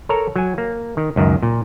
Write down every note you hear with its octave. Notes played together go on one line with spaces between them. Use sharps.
A4 A#4 C#5 A#5
F#3 G#5
A#3
D#3
C#2 F#2 D#3
A#2